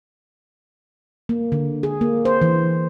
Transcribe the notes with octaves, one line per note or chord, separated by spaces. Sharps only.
A#3
D3
G#4
A#3
C5
E3